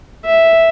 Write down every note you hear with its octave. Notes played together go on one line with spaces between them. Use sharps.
E5